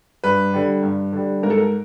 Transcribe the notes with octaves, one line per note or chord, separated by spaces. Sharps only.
G2 B4
D3 G3
G2
D3 G3
G#2 A#4
A4
A#4